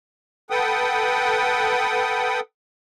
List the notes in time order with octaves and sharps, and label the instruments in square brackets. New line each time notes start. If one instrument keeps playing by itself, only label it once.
[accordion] A4 B4 F#5 G5 D#6